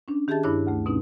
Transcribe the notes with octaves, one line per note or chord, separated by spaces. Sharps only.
C#4 D4
D#3 G4 G#4 E5 A5 A6
G2 D4 E4 C#5 D6 F#6
D2 A3
B2 C4 C#4 D#4